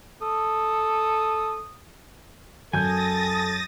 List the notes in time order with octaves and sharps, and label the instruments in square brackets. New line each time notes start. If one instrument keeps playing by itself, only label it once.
[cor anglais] A4 [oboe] D#6
[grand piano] F#2 G6 [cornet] A4 [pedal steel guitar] G#5 [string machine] D#6 A6 A#6